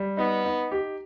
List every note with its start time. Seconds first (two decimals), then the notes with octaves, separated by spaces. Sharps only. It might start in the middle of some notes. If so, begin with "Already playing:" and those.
Already playing: G3
0.17 B3 D#4
0.45 D#4
0.71 G4